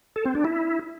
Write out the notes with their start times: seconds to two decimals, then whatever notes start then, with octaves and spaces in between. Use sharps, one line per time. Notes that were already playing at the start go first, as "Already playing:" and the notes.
0.16 A4
0.25 C4
0.35 D4
0.45 E4